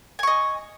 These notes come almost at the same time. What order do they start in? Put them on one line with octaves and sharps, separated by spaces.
G#5 C#6 D#5